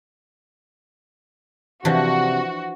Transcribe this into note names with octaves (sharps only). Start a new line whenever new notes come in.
C3 E3 F3 D4 F#4